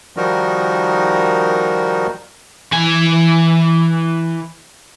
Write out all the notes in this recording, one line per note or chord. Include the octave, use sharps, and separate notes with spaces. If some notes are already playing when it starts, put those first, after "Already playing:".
D#3 F3 G3 D#4 F#4 A#4
E3 G#5